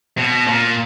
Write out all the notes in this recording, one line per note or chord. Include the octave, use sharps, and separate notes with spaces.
B2
A#2